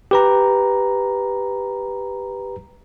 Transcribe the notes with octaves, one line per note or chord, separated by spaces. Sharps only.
G4 B4 A#5